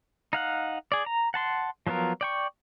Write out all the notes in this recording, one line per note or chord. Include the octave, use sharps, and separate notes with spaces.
D#4 F5 F#5
G#4 D5
A#5
F#5 A5 C6
F3 F#3 B3 F4 A#4
D5 G5 C#6